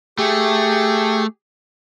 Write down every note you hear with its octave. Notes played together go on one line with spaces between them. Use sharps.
A3 G4 G#4